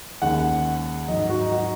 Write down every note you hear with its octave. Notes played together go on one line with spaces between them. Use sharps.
D#2 C#3 G#3 F#5
G#2 F#3 D#5
F#4
D#4
F#4